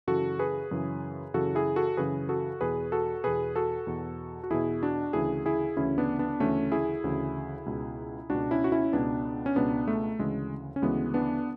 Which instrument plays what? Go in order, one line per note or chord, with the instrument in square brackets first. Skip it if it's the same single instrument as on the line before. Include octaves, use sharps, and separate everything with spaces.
[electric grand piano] F#2 C#3 E3 F#4 A4
G#4 B4
F#2 C#3 E3
F#2 C#3 E3 F#4 A4
E4 G#4
F#4 A4
F#2 C#3 E3 G#4 B4
F#4 A4
E2 B2 G#4 B4
F#4 A4
E2 B2 G#4 B4
F#4 A4
E2 B2
F#4
E2 B2 E4 G#4
D4 F#4
D2 C#3 E3 E4 G#4
E4 G#4
D2 C#3 E3 C#4 E4
B3 D4
B3 D4
D2 C#3 E3 A3 C#4
E4 G#4
D2 C#3 E3
C#2 B2
C#2 B2 D4 F#4
C#4 E4
F#4
C#4 E4
C#2 B2 B3 D4
C#4
C#2 B2 B3 D4
A3
D2 C#3 E3 G#3
C#4
D2 C#3 E3 G#3 B3
B3 D4